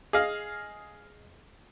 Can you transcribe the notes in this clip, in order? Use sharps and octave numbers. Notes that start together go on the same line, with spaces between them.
G#4 D#5 F5